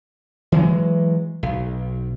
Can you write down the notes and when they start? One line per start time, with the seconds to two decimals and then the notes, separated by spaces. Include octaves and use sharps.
0.52 E3 F#3 G#3
1.43 B1